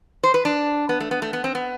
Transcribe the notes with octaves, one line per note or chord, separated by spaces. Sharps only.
C5
B4
D4
B3
A3
B3
A3
B3
C4
B3